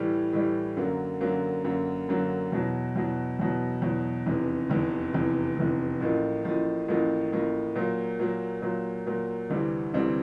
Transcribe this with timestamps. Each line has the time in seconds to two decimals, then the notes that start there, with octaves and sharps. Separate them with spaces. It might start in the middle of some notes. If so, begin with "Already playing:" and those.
Already playing: A2 E3 G3
0.33 A2 E3 G3
0.77 F#2 D3 F#3 A#3
1.21 F#2 D3 F#3 A#3
1.64 F#2 D3 F#3 A#3
2.09 F#2 D3 F#3 A#3
2.52 E2 B2 F#3
2.96 E2 B2 F#3
3.39 E2 B2 F#3
3.82 E2 B2 F#3
4.26 F1 E2 C3 E3
4.69 F1 E2 C3 E3
5.13 F1 E2 C3 E3
5.57 F1 E2 C3 E3
6.00 A1 A2 F3 A#3
6.44 A1 A2 F3 A#3
6.88 A1 A2 F3 A#3
7.32 A1 A2 F3 A#3
7.75 A#2 F#3 A#3
8.19 A#2 F#3 A#3
8.62 A#2 F#3 A#3
9.07 A#2 F#3 A#3
9.50 D2 C3 E3 G3 C4
9.94 D2 C3 E3 G3 C4